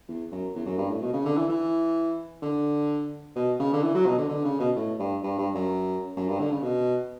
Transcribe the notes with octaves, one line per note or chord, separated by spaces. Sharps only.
E2
F#2
E2
F#2
G2
A2
B2
C#3
D3
E3
E3
D3
B2
C#3
D3
E3
F#3
B2
D3
D3
C#3
B2
A2
G2
G2
G2
F#2
F#2
G2
D3
C#3
B2